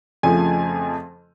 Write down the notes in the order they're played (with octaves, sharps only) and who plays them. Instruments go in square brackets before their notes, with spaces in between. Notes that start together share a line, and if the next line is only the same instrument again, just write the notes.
[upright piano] F2 C#3 F3 A3 G#5